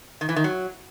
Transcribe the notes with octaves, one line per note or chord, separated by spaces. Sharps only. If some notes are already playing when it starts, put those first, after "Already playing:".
D#3
E3
D#3
F#3